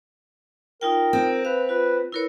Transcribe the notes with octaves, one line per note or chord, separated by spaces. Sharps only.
D#4 F4 A#4 G5
C4
B4 F5
F4 B4
E4 A#4 B4 C#5